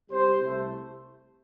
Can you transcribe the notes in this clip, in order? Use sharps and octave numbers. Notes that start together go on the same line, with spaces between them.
C2 C3 G3 G4 C5
C2 C3 A3